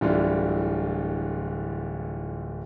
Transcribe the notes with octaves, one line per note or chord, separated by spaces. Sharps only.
D1 D3 E3 G3 F4